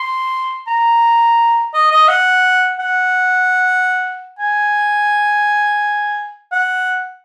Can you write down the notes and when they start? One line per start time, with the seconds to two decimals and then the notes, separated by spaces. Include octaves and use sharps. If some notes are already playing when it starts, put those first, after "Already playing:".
Already playing: C6
0.67 A#5
1.74 D#5
1.91 D#5
2.08 F#5
2.80 F#5
4.39 G#5
6.52 F#5